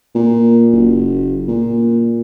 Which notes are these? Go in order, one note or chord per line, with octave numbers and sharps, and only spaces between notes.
A#2
F#1
A#2